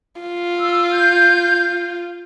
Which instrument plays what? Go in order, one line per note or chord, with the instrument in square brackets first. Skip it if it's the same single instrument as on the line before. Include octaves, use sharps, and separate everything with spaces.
[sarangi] F4
[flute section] E6
G6